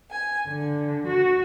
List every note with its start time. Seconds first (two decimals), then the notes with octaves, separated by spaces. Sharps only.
0.10 G#5
0.47 D3
1.07 F#4